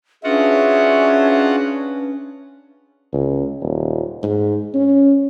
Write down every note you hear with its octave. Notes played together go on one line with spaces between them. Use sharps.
C#4 D4 F4 F#4 G#4 B4 E5 F#5
C#2
D#1
G#2
C#4